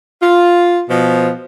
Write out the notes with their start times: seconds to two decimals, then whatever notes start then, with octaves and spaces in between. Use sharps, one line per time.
0.21 F4
0.89 B2 F3